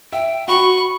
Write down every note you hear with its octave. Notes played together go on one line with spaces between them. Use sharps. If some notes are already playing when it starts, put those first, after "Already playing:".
E5 G5
F#4 B5 C#6